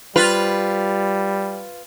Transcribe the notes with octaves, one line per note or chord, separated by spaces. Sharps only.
G3 F4 B4